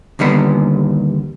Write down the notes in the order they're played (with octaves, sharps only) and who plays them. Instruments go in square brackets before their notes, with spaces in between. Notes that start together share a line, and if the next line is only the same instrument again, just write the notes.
[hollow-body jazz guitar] D#2 D3 G3 B3